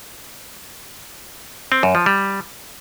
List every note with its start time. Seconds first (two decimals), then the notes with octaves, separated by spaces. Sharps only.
1.72 C4
1.83 F#2
1.95 F3
2.06 G3